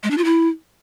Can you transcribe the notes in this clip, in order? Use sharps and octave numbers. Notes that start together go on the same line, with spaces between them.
G#3
D4
F4
E4